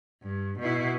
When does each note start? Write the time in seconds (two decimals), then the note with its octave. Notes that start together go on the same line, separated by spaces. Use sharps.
0.23 G2
0.59 B2 E4